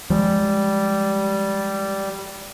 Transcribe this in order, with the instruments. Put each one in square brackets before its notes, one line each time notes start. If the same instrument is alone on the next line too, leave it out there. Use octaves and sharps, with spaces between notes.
[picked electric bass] F3 G#3 [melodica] G3